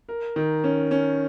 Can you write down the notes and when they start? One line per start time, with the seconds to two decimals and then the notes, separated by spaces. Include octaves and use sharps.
0.09 A#4
0.36 D#3
0.64 C#4
0.91 C#4